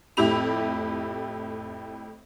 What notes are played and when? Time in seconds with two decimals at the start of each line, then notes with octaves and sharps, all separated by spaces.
0.17 F2 A2 E4 G4 B5 F7